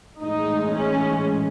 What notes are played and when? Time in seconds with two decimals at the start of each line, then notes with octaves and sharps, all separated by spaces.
0.23 A2 E3 G#3 D#4
0.76 C#4